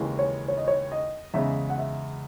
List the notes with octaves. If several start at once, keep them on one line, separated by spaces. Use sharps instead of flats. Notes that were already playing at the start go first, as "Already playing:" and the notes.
Already playing: D#2 C#3 E3 G#3
C#5
C#5
D#5
C#5
D#5
E2 C#3 G#3 E5
F#5
E5